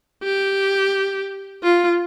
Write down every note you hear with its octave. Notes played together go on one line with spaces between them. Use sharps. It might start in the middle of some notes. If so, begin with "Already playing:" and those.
G4
F4